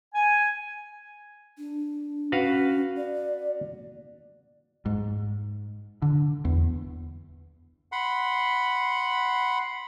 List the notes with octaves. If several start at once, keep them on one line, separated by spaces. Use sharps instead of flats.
G#5
D4
C#4 F#4 B4 F5
D5
G#2
D3
E2
F#5 B5 C6